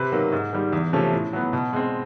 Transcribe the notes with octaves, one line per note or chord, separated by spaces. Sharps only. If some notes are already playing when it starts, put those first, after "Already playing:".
Already playing: C3 B4
D#3 F#3 A#3
G#2
D#3 G3
E2
C3 F3 A3 C#4
A2
F#3 B3
B2
G#3 C4